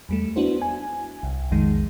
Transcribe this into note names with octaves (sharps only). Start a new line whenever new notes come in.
E2 G3 A3
B3 D4 E4 F#4 C5
G#5
C2
B1 F2 D#3 G#3